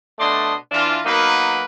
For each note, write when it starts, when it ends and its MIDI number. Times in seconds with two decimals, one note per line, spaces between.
0.19 0.54 47
0.19 0.54 57
0.19 0.54 62
0.19 0.54 74
0.19 0.54 75
0.19 0.54 84
0.72 1.00 52
0.72 1.00 62
0.72 1.00 65
1.06 1.64 54
1.06 1.64 58
1.06 1.64 59
1.06 1.64 63
1.06 1.64 70
1.06 1.64 71